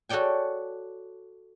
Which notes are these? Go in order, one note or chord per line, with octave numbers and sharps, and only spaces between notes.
F#4 A4 C#5 D5 G5 G#5